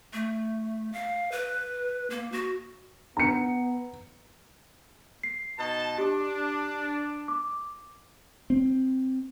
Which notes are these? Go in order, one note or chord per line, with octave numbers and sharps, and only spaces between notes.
A3
F5
B4
A#3
F#4
B3 A#5 C#7
C7
B2 D#4 A5
D4 G4
D6
C4